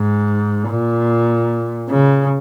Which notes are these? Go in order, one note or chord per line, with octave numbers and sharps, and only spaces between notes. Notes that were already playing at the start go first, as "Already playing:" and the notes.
Already playing: G#2
A#2
C#3